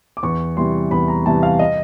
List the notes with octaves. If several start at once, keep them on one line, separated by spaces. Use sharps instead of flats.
D6
E2 C#6
C3 E3 G3 C6
E2 B5
A#5
C3 E3 G3 A5
F5
D#5